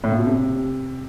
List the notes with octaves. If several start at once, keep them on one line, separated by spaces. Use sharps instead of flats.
A2
A#2
B2
C3